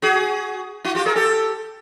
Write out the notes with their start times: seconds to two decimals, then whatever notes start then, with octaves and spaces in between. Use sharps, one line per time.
0.02 F#4 G#4
0.84 E4 F#4
0.95 F4 G4
1.06 G#4 A#4
1.15 G4 A4